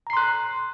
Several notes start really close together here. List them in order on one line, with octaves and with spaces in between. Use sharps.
A#5 C7 C6 F#6